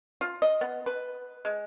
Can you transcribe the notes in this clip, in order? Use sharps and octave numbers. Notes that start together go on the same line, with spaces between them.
F4
D#5
B3
B4
G#3